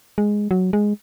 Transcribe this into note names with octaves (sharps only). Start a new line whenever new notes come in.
G#3
F#3
G#3